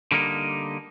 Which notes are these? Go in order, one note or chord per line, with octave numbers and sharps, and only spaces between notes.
D3 G3 A#3 D#4